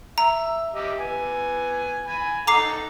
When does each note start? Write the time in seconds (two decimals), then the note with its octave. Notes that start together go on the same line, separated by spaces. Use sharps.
0.18 E5 A#5
0.74 G4 D#5 E5
0.99 B3 G#5
2.08 G#5 B5
2.47 D#4 A4 F#5 A#5 D6 C7